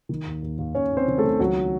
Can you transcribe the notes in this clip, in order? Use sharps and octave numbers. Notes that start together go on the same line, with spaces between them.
D#3
D#2
D#2
D#2
D#2 C#4 C#5
D#2
C4 C5
D#3
A3 A4
D#3
C#2 F#3 F#4